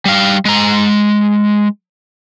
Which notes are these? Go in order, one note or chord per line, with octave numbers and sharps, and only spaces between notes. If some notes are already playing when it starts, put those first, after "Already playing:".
G3 F5
G#3 A#5